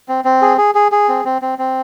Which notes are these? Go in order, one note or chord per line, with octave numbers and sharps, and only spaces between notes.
C4
C4
G#4
G#4
G#4
G#4
C4
C4
C4
C4